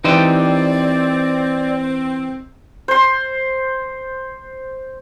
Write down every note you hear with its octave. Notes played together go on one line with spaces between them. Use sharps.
E3 C4 D#4 G4 C5 D5
C5 C6